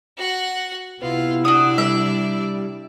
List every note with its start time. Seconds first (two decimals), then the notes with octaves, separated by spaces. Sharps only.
0.18 F#4 F#5
1.01 C3 B3 E4 F4
1.45 D4 F#4 D5 F#5 D#6
1.78 G3 E5